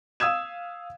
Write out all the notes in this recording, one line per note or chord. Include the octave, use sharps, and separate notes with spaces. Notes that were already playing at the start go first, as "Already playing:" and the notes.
F5 D#6 E6 G#6 E7